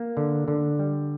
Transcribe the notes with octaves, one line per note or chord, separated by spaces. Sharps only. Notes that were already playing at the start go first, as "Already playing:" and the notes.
Already playing: A#3
D3
D3
G3